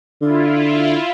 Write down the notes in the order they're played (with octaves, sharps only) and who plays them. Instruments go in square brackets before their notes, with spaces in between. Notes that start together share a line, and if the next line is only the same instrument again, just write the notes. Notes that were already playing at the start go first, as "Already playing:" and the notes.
[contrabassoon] D3 [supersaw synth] E4 F4